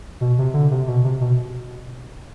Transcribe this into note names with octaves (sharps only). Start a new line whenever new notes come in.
B2
C3
D3
C3
B2
C3
B2